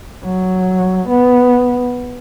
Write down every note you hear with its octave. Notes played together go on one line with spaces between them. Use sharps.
F#3
B3